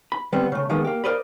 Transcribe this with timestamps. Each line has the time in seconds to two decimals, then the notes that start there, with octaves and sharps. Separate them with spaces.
0.12 B5
0.32 D3 G3 B3 C4
0.52 C#3 A3
0.69 D#3 F3 G#3 A#3 B3
0.84 A#3 G4
1.04 A#4 C5 D5 D#5 F5 B5